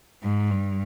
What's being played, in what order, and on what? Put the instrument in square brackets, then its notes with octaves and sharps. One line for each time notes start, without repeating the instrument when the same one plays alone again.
[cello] G#2
G2